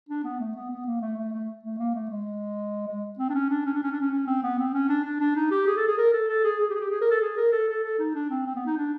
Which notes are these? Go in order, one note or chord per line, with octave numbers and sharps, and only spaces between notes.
D4
B3
A3
B3
B3
A#3
A3
A3
A3
A3
A#3
A3
G#3
G#3
C4
D4
C#4
D4
C#4
D4
C#4
D4
C#4
C#4
C4
B3
C4
C#4
D4
D4
D4
D#4
G4
G#4
A4
G#4
A#4
A4
A4
G#4
G#4
G4
G#4
G4
G#4
A#4
A4
G#4
A#4
A4
A4
A4
D#4
D4
C4
C4
B3
D#4
D4